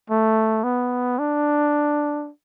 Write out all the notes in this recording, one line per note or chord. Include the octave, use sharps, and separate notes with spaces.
A3
B3
D4